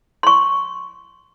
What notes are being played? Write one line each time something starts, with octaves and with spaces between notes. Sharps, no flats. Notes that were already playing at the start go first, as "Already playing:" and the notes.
C6 C#6